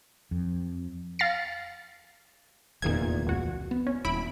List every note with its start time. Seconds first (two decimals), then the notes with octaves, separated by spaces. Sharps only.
0.31 F2
1.19 F5 A6 A#6 C7
2.82 F1 E2 A#2 D#3 G#6
3.27 C#2 F#4
3.71 B3
3.87 C#4
4.05 D#1 E4 B5 D7